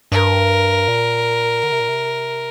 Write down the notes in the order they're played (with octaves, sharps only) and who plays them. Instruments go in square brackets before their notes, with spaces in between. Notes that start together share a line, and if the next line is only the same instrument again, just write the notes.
[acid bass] G2 [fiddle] A#4
[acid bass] A#2
D3
C3
A#2
C3